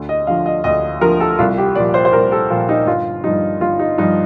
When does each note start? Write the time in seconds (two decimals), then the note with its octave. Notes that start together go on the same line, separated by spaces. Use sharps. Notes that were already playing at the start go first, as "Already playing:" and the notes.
Already playing: D2
0.09 D#5
0.27 D3 F3 F5
0.46 D#5
0.64 D2 D#5
1.01 D3 F3 A#4
1.20 A4
1.38 C2 F4
1.57 G4
1.75 A#2 F3 D5
1.94 C5
2.05 C5
2.13 C2 A#4
2.32 A4
2.50 A#2 F3 F4
2.69 D#4
2.87 G1 F4
3.24 G2 F3 D#4
3.61 G1 F4
3.79 D#4
3.98 G2 F3 D#4